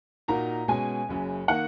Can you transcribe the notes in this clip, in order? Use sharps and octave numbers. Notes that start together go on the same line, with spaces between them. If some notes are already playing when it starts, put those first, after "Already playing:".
A#2 A#3 D#4 F#4 A#4 A#5
B2 G#3 C#4 G#5
F#1 F#2 C#3
D#3 A#3 F#5